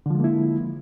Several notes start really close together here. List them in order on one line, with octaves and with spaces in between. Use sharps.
D3 F3 G#3 A#3 E4